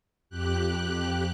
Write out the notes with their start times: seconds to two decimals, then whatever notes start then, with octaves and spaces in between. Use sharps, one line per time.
0.29 F2 G4 F#6